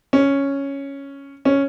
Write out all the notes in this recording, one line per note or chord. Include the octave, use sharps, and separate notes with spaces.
C#4
C#4